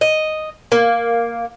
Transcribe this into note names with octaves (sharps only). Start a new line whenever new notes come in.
D#5
A#3